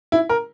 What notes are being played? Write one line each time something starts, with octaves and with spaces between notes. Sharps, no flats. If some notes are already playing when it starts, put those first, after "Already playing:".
E4
A#4